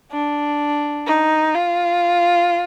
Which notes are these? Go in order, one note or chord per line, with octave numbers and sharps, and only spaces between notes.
D4
D#4
F4